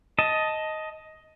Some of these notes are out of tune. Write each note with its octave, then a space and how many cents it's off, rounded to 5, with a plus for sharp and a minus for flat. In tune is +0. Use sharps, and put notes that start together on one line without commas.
D#5 +10 A5 +0